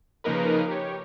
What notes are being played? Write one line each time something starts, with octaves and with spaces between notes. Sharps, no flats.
C#3 F3 A#3 D#4 A#4 B4
G4 C#5